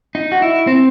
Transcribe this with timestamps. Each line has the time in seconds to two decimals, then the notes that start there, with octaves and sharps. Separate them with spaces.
0.15 D#4
0.32 F#4
0.42 E4
0.67 C4